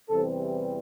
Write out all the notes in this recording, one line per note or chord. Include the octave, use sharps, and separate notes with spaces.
E2 C3 E3 G3 C4 A4